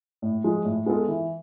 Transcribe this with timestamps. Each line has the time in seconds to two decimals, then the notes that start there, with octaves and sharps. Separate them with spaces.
0.22 A2
0.44 F3 G#3
0.65 A2
0.86 G#3 B3 F4 A4
1.08 E3